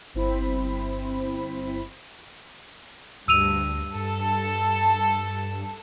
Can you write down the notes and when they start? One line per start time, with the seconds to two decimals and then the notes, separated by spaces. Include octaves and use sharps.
0.14 G1 C4 E4 C5 B5
3.28 D2 G2 E6 D#7 F7
3.95 G2 A4